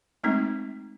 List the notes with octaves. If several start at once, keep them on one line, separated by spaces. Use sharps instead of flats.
G#3 A3 C4 D#4